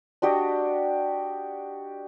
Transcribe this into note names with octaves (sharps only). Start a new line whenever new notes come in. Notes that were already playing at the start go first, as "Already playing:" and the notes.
D4 F#4 G4 D#5